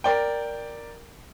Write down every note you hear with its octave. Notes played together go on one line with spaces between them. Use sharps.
A#4 D5 G5